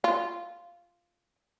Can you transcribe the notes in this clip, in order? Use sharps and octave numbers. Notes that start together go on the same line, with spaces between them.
F4